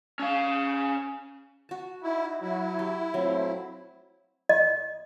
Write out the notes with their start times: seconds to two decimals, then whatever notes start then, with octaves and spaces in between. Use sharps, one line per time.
0.19 C#4 F5
1.69 F#4 A5
2.03 D#4 E4 E5
2.41 F#3 E4
2.79 G4
3.14 A#2 F#3 A3 C4 F4
4.49 D#5